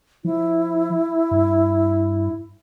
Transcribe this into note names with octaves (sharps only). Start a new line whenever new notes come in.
F3 E4
G2